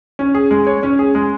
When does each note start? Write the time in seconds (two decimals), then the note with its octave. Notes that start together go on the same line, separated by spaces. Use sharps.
0.19 C#4
0.34 G#4
0.51 G#3
0.67 C#5
0.83 C#4
0.99 G#4
1.15 G#3